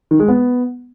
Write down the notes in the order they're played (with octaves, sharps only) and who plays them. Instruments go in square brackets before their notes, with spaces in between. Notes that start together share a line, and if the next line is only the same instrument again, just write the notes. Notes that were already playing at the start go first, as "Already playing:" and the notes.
[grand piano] D#3
G#3
B3